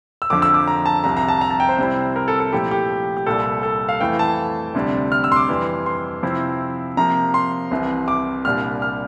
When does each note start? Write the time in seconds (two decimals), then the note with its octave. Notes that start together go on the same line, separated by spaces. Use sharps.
0.22 E6
0.30 F2 D3 F3 D6
0.42 E6
0.54 D6
0.68 A#5
0.86 A5
1.04 C2 C3 F3 A#5
1.17 A#5
1.28 A5
1.41 A#5
1.51 A5
1.60 G5
1.69 C5
1.78 C3 G3 C4 E4
2.16 A#4
2.28 A4
2.40 A4
2.53 A#2 F3 A3 E4 G4
2.71 G4
3.17 G4
3.26 C2 A#2 G3 A4
3.63 A4
3.89 F5
4.01 F2 E3 A3 E4 G5
4.19 A5
4.75 D2 C3 G3 D4
5.12 F6
5.24 E6
5.32 C6
5.36 D6
5.49 F2 E3 G3
5.86 C6
6.23 C3 F3 C4 E4
6.97 C3 F3 A#3 A#5
7.34 C6
7.71 C2 C3 E3
8.08 D6
8.45 C2 A#2 G3 D4 F6
8.82 F6